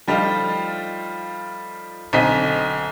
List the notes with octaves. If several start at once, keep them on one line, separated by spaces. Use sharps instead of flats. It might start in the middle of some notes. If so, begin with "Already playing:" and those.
F3 G3 A3 D#4 F4
B1 D3 C4 D#5 G#5 B6